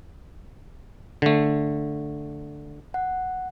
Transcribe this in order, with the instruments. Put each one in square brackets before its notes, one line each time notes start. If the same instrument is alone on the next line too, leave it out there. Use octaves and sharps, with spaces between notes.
[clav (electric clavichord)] D3 A3
[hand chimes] F#5